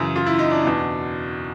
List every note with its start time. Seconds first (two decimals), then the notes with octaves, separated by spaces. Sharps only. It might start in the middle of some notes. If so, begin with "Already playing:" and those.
Already playing: F#2 C#3 E3
0.16 F4
0.26 E4
0.39 D#4
0.51 D4
0.64 E2 B2 D4